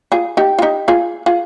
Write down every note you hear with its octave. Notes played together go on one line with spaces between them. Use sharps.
F4 G#4
D#4 G4
F4
D#4 G4
F4 G#4
F4 G#4